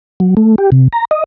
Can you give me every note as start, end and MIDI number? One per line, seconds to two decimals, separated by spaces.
0.20 0.35 54
0.37 0.55 57
0.58 0.70 67
0.72 0.88 48
0.93 1.05 82
1.11 1.24 75